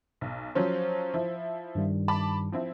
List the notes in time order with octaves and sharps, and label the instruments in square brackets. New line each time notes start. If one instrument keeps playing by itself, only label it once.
[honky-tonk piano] B1
[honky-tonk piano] F3 F#3 C#4 [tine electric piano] C5
[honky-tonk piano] F3 E4
[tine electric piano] G2 D#3 G3
[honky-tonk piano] A5 B5 D6
F3 C4 E4